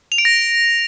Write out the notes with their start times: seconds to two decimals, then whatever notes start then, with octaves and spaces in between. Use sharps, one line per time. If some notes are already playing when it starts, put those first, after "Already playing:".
0.12 F7
0.18 D7
0.25 A#6